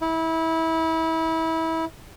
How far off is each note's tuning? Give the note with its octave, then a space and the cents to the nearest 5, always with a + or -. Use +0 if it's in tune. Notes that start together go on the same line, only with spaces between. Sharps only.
E4 -25